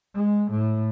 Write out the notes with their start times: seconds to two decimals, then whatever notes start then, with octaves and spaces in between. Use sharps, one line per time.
0.15 G#3
0.51 A2